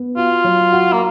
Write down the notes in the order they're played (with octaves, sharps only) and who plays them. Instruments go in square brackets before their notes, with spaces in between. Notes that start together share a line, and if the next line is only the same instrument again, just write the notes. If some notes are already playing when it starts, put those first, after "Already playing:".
Already playing: [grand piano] B3
[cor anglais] F4 [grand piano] F#4
[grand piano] F#3
F#4
[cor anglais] A#3